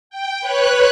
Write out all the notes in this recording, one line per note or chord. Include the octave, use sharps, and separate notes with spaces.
G5
B4 C#5 F#6